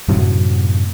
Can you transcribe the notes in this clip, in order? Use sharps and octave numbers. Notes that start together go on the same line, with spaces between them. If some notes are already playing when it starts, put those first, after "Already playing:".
F#2 A2 C3 F#3